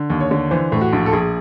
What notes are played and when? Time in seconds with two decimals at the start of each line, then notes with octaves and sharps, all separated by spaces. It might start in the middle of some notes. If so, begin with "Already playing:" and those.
Already playing: D3
0.10 D#2
0.20 C#5
0.31 D3
0.51 E3 C5
0.72 A2
0.81 F#4
0.93 A#1
1.06 A4
1.13 A#1 G#4